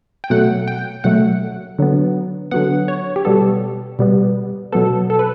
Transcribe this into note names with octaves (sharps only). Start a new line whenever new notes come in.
G5
B2 F#3 A3 F#5
G5
B2 F#3 A3 F#5
D3 F#3 B3
D3 F#3 B3 F#5
C#5
G4
B2 G3 B3 A4
B2 G3 B3
B2 F#3 B3 A4
A4
B4